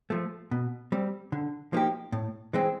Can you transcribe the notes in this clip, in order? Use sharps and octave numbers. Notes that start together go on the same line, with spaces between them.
F3 A3
B2
G3 C4
D3
F3 A#3 D#4 G4
A2
E3 G#3 C4